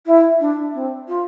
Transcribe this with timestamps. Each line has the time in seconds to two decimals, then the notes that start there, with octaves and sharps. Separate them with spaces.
0.06 E4
0.40 D4
0.74 C4
1.08 F4